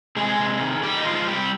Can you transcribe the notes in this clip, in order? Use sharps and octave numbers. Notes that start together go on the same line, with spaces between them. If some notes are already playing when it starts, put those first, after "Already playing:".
C3 G#3 G#4
C3
D#3
D#3 G3 G4
D#4
F3 G#3 F4
C3 G3 G4